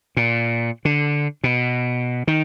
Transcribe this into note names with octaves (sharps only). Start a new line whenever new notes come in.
A#2
D3
B2
D#3